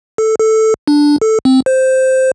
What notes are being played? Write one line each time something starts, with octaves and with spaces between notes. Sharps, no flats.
A4
A4
D4
A4
C4
C5